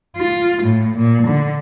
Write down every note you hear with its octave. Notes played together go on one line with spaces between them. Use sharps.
F4
A2
A#2
D3